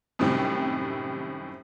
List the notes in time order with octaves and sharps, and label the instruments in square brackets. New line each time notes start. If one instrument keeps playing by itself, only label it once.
[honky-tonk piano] F#2 A2 C3 D#3 G3 C4